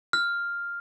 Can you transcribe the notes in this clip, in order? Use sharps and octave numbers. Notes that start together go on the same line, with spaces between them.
F6